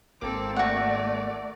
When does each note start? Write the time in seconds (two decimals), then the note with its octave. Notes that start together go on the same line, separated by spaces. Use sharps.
0.21 G#1 A#3 C4 A4 D6
0.56 A3 F#4 D5 F#5